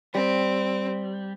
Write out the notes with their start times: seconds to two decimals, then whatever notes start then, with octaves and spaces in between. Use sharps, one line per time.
0.15 G3 C4